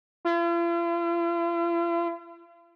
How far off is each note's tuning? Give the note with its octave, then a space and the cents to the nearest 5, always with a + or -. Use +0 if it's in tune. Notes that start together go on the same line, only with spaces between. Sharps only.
F4 -45